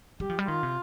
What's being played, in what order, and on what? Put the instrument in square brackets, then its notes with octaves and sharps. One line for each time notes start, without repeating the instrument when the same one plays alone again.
[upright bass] G3 [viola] G4
[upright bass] F3
G3
[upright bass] D#3 [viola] F4
[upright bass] C3